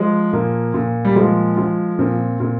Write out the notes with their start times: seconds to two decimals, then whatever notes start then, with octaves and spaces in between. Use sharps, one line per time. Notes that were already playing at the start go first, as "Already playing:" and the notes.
Already playing: F3 G#3
0.33 A#2 A#3
0.74 A#2
1.05 G3
1.16 F3 G#3
1.57 F3
1.99 A#2 C4
2.40 A#2